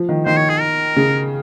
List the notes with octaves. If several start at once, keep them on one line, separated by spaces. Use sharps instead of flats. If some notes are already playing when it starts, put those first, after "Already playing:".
Already playing: F3
D#3
D#3 C5
C#5
G#4
A#4
C#3